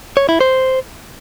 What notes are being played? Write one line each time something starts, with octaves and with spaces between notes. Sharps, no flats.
C#5
E4
C5